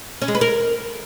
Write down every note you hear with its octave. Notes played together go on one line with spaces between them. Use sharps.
C#4
G#3
B4
A#4